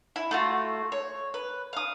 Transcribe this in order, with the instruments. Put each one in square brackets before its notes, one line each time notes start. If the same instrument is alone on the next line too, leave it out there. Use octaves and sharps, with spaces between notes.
[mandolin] E4
A3 F4 F#4
C#5
B4
F5 D#6